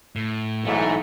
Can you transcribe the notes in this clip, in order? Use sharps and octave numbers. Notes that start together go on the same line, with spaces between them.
A2
B1 G#2 E3 A3